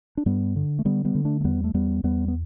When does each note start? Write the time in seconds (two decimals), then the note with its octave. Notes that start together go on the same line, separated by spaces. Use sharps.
0.17 D4
0.26 G2 G3 B3
0.56 D3
0.79 A3
0.85 D3 G3 B3
1.05 G3 B3
1.15 D3
1.25 A3 D4
1.41 A3
1.44 E2 G3 B3
1.64 A3
1.74 E2 G3 B3
2.04 E2 G3 B3
2.28 B3